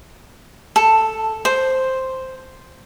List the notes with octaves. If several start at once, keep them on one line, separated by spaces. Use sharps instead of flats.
A4
C5